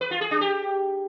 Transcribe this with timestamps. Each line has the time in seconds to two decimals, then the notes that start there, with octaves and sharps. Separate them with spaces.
0.01 B4
0.11 F4
0.21 G#4
0.31 D4
0.41 G4